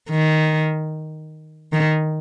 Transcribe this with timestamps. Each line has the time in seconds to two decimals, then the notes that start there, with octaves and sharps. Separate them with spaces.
0.10 D#3
1.73 D#3